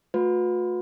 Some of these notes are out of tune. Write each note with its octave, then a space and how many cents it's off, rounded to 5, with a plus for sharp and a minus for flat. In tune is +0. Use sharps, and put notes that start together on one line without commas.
A3 +0 F#4 -45 B4 +0